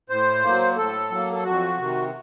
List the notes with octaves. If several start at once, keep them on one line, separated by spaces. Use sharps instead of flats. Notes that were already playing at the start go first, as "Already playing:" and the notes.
A2 C5
F#3 A#3
A2 A4
F#3 A#3
A4
F2 F#4
C3 D#3